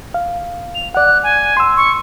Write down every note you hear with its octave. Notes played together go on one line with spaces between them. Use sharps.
F5
F7
D5 F#5 F#6
G#5
C6 E6
C#6